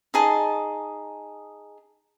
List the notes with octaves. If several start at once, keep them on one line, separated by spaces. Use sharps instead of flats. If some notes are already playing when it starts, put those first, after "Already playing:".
D#4 G#4 A5